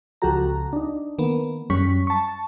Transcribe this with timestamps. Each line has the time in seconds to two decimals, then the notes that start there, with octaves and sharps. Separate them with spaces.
0.22 C#2 F3 F#4 G4 A4 A#5
0.73 D4 D#4
1.18 D#3 A#3 B3
1.70 F#2 G3 C#4 C#6 B6
2.07 A5 C#6